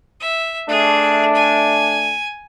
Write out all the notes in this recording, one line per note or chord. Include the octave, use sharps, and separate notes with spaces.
E5
A3 D4 G#4
G#5